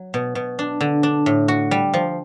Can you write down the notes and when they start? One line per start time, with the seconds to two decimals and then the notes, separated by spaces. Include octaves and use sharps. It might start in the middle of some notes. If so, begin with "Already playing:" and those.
Already playing: F#3
0.14 B2
0.35 B2
0.59 D4
0.81 D3
1.03 D4
1.26 A2
1.48 F#4
1.71 G3
1.94 F3